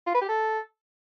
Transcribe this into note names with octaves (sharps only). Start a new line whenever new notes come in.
F4
B4
G4
A4